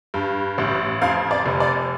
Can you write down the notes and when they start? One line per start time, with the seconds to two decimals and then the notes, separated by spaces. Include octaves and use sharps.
0.14 G2
0.58 A1
1.02 F2 F5
1.31 D5
1.46 F1
1.60 D5